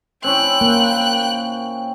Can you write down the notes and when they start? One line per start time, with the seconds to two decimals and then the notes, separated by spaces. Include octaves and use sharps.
0.24 C4 C#4 E4 G5 F#6
0.61 A#3